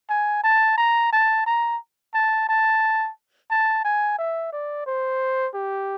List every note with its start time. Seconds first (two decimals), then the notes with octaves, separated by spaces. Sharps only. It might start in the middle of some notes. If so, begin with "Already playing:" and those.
0.10 G#5
0.44 A5
0.78 A#5
1.13 A5
1.46 A#5
2.14 A5
2.49 A5
3.51 A5
3.85 G#5
4.19 E5
4.52 D5
4.86 C5
5.54 G4